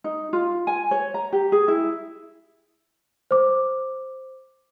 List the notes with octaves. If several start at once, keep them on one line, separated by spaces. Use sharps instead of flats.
D#4
F4
G#5
C#5
A#5
G4
G#4
E4
C5 D6